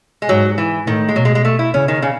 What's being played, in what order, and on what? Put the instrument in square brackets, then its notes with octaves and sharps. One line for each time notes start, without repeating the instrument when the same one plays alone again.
[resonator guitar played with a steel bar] G#3
[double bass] G#2 [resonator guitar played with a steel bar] F#3
[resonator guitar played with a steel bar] E3
[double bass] A2 [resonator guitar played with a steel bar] D#3
[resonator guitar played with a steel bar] G#3
[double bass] B2 [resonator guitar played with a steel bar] F#3
[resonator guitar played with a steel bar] G#3
G#3
A3
E4
[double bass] C#3 [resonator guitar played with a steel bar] C#4
[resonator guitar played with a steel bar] D#3
C#3